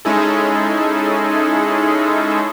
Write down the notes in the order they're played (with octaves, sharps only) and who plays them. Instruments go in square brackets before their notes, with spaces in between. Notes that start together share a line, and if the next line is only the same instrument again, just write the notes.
[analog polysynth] G#3 C#4 D#4 E4 G#4 A4